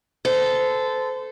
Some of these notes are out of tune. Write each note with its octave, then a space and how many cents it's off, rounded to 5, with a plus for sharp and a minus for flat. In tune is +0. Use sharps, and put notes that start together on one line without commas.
A4 -10 C5 -30